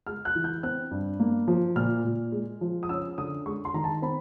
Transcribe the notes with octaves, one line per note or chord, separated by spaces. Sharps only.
G#3 F6
F#6
E3
G6
C4 F#6
G2
A#3
F3
A#2 F6
A#2
G#3
F3
D#6
C#4 E6
D3 D#6
G#3 C#6
C6
D#3 A#5
A5
C4 B5